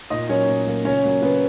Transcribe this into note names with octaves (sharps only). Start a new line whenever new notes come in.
A#2 D#4 D#5
F#3 A#3 C#4 C#5
A#2
F#3 A#3
C#3 C#4 C#5
F#3 A#3
C#3 B3 B4